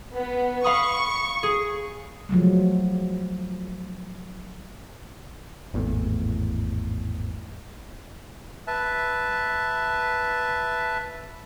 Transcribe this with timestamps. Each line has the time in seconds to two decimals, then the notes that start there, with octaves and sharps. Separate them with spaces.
0.15 B3
0.64 F5 B5 C#6 D#6
1.43 G#4
2.29 F3 F#3 G#3 A3
5.74 G#1 E2 A2
8.67 B4 E5 A5